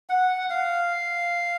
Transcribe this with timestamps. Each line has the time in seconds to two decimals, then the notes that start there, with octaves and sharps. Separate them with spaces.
0.10 F#5
0.50 F5